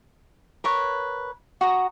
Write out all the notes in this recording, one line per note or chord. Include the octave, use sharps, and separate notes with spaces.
A#4 B4 C#5
F#4 A#5 D#6